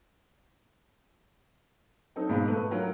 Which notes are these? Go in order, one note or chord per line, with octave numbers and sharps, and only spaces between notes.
F#3 C4 D#4 A4
G#1 G#2 B2 G#3 F5 B5
A3 A4 B4
F#3 F4 A#4